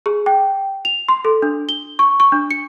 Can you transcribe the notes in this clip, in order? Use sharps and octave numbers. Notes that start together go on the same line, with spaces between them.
G#4
G5
F7
C6
A4
D4
G7
C#6
C#6
D4
C#7